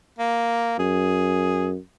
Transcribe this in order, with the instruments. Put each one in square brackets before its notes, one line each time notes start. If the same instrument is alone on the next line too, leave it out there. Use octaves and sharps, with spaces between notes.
[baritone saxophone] A#3
[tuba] F#2 [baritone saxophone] G#4